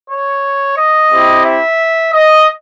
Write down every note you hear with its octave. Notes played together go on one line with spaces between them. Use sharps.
C#5
D#5
C4 E4 G4
E5
D#5